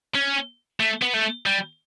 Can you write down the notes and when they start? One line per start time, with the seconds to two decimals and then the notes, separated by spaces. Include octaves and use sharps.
0.15 C#4
0.80 A3
1.02 B3
1.14 A3
1.46 G3